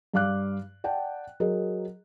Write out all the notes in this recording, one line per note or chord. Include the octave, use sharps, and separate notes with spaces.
G2 D5 F5 D6 F#6
D5 F#5 G5 A5
F#3 G#4 A#4 D#5